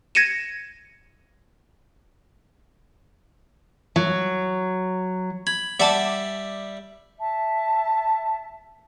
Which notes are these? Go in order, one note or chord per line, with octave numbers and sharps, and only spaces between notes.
G#6 A#6 C#7 D#7 E7
F#3
B5 G#6
G3 D5 E5 F#5 A5 D6
E5 A5